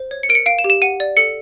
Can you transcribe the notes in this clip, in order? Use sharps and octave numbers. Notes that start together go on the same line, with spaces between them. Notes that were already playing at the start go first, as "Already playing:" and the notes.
Already playing: C5
C#5
C#7
A#4 D7
C#7
F5 D7
E7
G4
E7
F#5 D#7
D5
A4 C#7